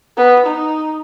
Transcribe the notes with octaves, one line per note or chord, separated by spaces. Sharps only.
B3
D#4